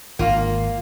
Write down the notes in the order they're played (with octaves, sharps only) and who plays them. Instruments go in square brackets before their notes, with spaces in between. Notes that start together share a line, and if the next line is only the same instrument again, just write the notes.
[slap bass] G#1 [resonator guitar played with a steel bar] A#3 F4